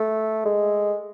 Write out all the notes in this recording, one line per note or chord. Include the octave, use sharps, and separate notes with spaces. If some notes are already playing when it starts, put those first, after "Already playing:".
Already playing: A3
G#3